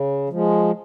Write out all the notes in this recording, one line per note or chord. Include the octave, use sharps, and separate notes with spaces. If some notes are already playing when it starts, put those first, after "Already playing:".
Already playing: C#3
F3 G#3